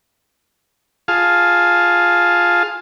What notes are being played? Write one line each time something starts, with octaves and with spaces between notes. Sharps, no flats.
F4 G#4 F5 A5